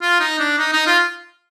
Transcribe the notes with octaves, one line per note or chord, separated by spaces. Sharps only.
F4
D#4
D4
D#4
D#4
F4